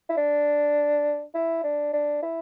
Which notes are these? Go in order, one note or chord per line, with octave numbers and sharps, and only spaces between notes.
E4
D4
E4
D4
D4
E4